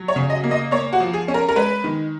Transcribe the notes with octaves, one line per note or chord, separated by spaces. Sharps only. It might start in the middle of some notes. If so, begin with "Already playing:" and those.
Already playing: F#3
C#5
C#3
D#5
A#3
D#5
A#3 C#5
F#4
F3
G#4
C#4
A#4
A#4
G#3 B4
D#3